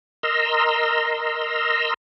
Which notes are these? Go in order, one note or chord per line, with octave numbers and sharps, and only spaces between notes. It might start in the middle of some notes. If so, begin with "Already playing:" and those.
A#4 D#5 A#5 C6 E6